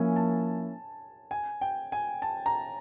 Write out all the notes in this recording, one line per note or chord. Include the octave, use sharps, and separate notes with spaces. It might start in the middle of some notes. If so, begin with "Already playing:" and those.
Already playing: F3 A#3 C#4 E4 G#5
A5
G#5
G5
G#5
A5
A#5